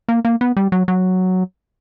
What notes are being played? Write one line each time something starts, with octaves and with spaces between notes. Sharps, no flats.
A#3
A#3
B3
G3
F#3
F#3